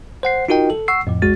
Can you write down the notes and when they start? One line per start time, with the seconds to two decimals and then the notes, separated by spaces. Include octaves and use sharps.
0.23 C5 F#5 C7
0.49 D#4 F4 F#4 A#4 D#5 G5
0.70 A4
0.88 F#5 C#6 E6 C7
1.07 F2 A2 F3
1.22 A#1 E2 G#3 F#4 A6